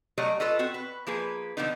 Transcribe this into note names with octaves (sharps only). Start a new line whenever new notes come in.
F#3 G3 A3 C#5 D#5
F4 A4 B4 D#5
C4 F#4
B4
F3 A#3 G#4 B4
D3 F3 G3 B3 C4 D#4